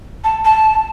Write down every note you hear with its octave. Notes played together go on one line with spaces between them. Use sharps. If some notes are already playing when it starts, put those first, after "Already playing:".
A5
A5